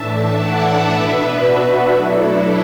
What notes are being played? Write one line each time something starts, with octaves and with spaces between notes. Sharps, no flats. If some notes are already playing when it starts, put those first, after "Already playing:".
Already playing: A2 E3 A3 D4 E5 A5
D5 F#5
B2 B3 D4 B4 E5
F#4 B4
B2 F#3 A3 D4 E4 A4